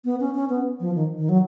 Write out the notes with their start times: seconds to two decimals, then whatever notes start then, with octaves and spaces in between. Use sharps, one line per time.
0.05 B3
0.20 C#4
0.34 C#4
0.49 B3
0.80 F3
0.95 D#3
1.18 D#3
1.29 F#3